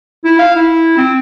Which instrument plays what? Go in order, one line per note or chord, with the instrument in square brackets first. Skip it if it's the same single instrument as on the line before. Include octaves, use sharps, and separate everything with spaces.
[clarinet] E4
F5
E4
C4